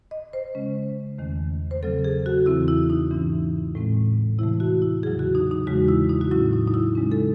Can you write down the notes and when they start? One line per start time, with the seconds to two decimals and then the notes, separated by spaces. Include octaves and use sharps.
0.11 D#5
0.33 C5
0.55 C#3 G#3 C#4
1.19 E2 D#3 A3 C#4
1.71 C5
1.83 C#3 F#3 A3 C4 A4
2.05 G#4
2.26 F#4
2.46 E2 C#3 E3 C4 E4
2.68 E4
2.90 D#4
3.11 G#2 E3 A3 C#4
3.75 A2 G#3 C4
4.38 C3 E3 A3 E4
4.60 F#4
4.82 E4
5.03 E2 C#3 F#3 G#4
5.19 F#4
5.35 D#4
5.51 D#4
5.67 E2 C#3 E3 G#3 F#4
5.88 E4
6.10 D#4
6.21 F#4
6.31 A2 F#3 C#4 E4
6.53 D#4
6.67 D#4
6.74 E4
6.95 C#3 G#3 C#4
7.12 A4